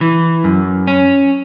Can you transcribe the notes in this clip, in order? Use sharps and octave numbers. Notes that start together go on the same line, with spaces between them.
E3
F#2
C#4